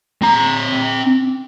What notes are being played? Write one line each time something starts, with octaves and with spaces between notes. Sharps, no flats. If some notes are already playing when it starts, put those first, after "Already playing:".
C4 A#5